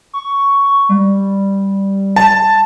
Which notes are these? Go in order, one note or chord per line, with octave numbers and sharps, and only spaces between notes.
C#6
G3
A5